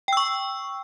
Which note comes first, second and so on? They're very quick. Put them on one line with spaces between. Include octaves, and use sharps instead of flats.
G5 E6 C#6